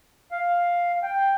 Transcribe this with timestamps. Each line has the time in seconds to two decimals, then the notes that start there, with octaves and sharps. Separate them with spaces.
0.32 F5
1.03 G5